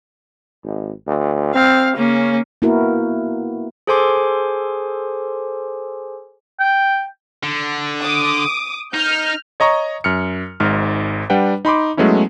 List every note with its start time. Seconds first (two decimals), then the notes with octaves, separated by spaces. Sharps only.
0.64 G#1
1.07 D2
1.54 C4 F5
1.97 C#3 A#3 C#4
2.62 A#3 B3 E4 F#4 A#4
3.87 G#4 A4 C5 G#5 C6 D6
6.60 G5
7.43 D3
8.02 D6 D#6
8.94 D#4 F6 G6
9.60 C#5 D#5 A#5 C#6
10.04 F#2 F6 C#7
10.60 G#1 G#2 F6
11.30 G3 D4 B4 F#5 G5
11.65 D#4 B5 C6 D6
11.97 F#3 G#3 A3 B3 C#4 E4